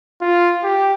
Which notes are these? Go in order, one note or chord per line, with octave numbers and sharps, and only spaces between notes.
F4
G4